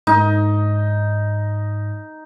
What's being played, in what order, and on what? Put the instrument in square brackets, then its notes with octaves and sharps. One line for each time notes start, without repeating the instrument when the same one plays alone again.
[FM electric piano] G#2 [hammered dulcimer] D#4